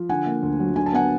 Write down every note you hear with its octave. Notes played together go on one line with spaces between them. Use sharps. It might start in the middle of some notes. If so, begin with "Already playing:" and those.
Already playing: F3
D3 F#5 G#5
A#3
D2
F#3
D3 G#5
A5
B3 F#5 G#5